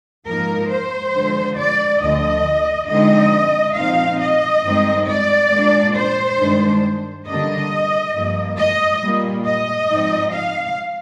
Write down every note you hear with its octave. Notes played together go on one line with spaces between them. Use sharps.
G#2 F3 A#3 D#4 A#4
C5
D3 F3 G#3
D5
D2 D3 F3 D#5
D3 F3 G#3 C4 D#4 D#5
A#2 F3 C4 D#4 F5
D#5
G2 D#3 G#3 C4 D#4
D5
A#2 G#3 D4
C5
G2 D#3 G#3 D4
D3 G3 A#3 D4 D#5
G2 F3 A#3
D#5
A#2 G3 A#3
D#5
G#2 F3 C4 D#4
F5